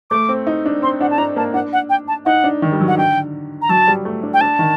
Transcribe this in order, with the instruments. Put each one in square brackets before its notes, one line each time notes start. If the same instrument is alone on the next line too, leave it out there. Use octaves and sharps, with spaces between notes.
[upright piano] A3 [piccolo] D6
[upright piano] C4
D#4
D4
[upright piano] C4 [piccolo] C6
[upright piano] D4 [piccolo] F#5
[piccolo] A5
[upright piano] D4 [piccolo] A#5
[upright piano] A#3 [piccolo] A5
[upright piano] D4 [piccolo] F#5
[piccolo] F#5
G5
A5
[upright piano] D#4 [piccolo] F#5
[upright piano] D4
D#3
G3
F#3
[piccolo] F#5
[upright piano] D3 [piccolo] G5
[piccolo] A#5
[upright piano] F#3 [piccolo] A5
[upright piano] G3
A3
D4
[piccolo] G5
[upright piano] D4 [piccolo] A5
[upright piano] D#3